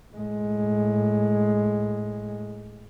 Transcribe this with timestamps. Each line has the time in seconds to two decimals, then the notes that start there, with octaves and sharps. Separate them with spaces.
0.14 A2 G#3